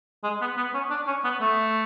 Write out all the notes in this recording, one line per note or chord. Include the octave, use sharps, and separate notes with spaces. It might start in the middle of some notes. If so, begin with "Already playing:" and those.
G#3
B3
B3
C#4
D4
C#4
B3
A3